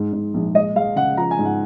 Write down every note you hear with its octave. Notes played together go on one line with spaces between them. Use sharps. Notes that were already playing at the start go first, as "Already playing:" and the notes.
Already playing: G#2 G#3
G#2
A#1
G#3 D#5
G#3 F5
C#3 F#5
F3 A#5
G#5
G#2
F#5